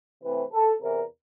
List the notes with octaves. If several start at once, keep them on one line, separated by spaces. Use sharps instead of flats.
C3 E3 A3 C4 B4
A4
E2 C3 E3 A#4